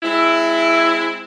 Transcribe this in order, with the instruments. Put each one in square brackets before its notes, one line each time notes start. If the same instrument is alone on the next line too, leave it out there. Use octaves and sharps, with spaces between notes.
[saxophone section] G#3 C4 E4